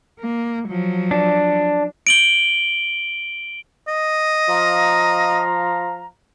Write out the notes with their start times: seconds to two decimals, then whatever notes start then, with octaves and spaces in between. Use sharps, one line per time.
0.20 A#3
0.69 F3 F#3
1.11 D4
2.07 D7 F#7 G7
3.88 D#5
4.49 F3 F5 A#5